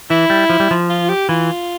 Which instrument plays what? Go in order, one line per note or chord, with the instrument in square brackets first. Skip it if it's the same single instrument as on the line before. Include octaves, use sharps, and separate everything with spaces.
[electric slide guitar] E3 [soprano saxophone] E4
[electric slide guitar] G3
F3
G3
F3
[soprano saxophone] F4
G4
[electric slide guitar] E3 [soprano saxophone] F4